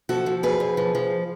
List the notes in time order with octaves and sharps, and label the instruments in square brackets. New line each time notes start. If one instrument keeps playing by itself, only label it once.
[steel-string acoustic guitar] F3 F#4 A4
F3
F2 G#4 B4
F2
F3
F3